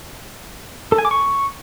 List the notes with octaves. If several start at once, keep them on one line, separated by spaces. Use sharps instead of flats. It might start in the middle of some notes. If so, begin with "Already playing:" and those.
A4
G#5
D6
C#6